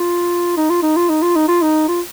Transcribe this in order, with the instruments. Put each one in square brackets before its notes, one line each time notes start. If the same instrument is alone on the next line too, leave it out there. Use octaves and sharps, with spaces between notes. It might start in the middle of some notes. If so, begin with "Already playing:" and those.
Already playing: [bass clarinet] F4
D#4
F4
D#4
F4
D#4
F4
D#4
F4
D#4
F4